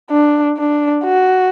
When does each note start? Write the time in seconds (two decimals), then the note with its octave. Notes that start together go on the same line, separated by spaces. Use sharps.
0.11 D4
0.58 D4
1.04 F#4